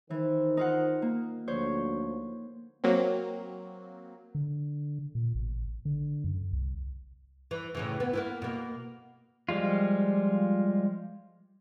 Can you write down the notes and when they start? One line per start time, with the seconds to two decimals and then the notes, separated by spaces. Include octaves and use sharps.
0.10 D#3 E3 C5
0.57 D#4 F4 F#5
1.02 A#3
1.48 D2 F3 C5 C#5
2.84 F#3 A#3 C4
4.35 D3
5.15 A#2
5.35 A1
5.85 D3
6.24 F#2
6.53 C2
7.51 E3
7.75 A2 C#3 E3
8.00 B3
8.13 A#3 B3 E4
8.42 B2 A#3
9.49 F3 G3 G#3 F4